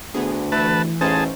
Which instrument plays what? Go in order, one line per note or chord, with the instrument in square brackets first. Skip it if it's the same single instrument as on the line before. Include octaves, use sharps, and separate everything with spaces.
[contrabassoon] D2 [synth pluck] B3 G#4
[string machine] E3 [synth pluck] A3 E4 [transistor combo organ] B4 A5
[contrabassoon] A1 [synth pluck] C#4 D#4 C5 [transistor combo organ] G#4 A5